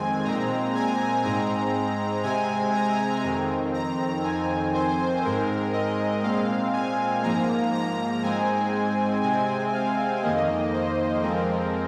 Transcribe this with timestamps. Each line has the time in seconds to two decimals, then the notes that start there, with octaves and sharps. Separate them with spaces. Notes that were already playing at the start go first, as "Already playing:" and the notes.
Already playing: F2 D#3 G#3 C4 G#5
0.24 A#2 G#3 C4 A#5
0.75 G#5
1.24 G#2 G#3 C4 A#5
2.24 C3 G#3 C4 G#5
2.74 A#5
3.24 F2 D#3 C4
3.74 A#5
4.24 F2 D#3 C4 G#5
4.74 C5
5.23 G#2 G#3 C4 A#4
5.73 D#5
6.23 A#2 G#3 C4 F5
6.74 G#5
7.23 G#2 F3 A#3 A#5
7.73 A#5
8.23 G#2 G#3 C4 G#5
9.23 C3 G#3 C4 G#5
9.73 F5
10.23 F2 D#3 A#3 D#5
10.73 C5
11.23 F2 F3 G#3 C4 A#4